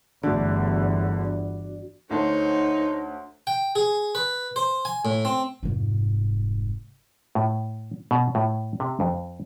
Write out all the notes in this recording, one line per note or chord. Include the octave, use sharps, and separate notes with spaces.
G1 E2 D3 A3 D4 F#4 D5
D2 D#4 A4 C5 C#5 A5
G5
G#4
B4
C5
G#5
A2
C4
F1 G#2
A2
B2
A2
C3
F2